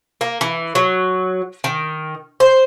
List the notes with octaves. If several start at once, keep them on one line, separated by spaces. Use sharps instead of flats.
A#3
E3
F#3
D#3
C5